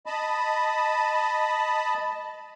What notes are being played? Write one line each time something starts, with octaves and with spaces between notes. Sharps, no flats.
D#5 A5 B5